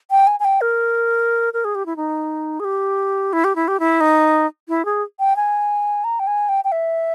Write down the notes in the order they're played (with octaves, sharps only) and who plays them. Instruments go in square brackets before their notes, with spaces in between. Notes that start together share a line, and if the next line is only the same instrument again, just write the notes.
[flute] G5
G#5
G#5
G5
A#4
A#4
G#4
G4
E4
D#4
G#4
G4
E4
G4
E4
G4
E4
D#4
E4
G#4
G5
G#5
A#5
G5
G#5
G5
G5
E5